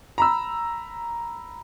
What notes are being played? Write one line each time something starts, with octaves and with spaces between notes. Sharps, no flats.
A#5 B5 E6